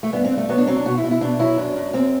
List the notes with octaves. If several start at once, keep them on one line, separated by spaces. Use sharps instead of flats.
A3
G2 B3
C4
G2
A3
F#3 B3
D4
F#3 C4
D4
B2 F#4
E4
B2
E4
B2 D4
F#3 E4
F#2 D4
F#2
F#2 C4